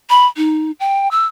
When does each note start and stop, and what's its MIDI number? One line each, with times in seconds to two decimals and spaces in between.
0.10 0.26 83
0.37 0.71 63
0.80 1.08 79
1.11 1.25 88